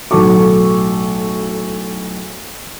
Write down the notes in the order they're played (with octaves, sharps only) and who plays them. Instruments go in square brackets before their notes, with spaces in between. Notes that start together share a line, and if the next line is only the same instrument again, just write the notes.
[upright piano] B1 A2 F#4 A4 C#6 D6